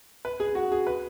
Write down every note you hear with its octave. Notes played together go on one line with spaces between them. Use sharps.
B4
G#4
F#4
G#4
B4